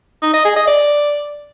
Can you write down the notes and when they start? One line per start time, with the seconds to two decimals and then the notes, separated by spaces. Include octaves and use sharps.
0.22 D#4
0.34 D#5
0.45 G#4
0.56 D#5
0.68 D5